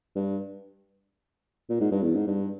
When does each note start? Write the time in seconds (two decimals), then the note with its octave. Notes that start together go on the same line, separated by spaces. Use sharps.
0.16 G2
1.70 A#2
1.81 G#2
1.92 G2
2.03 E2
2.15 G#2
2.27 G2